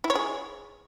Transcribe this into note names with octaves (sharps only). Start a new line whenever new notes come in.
E4
C#5
G#4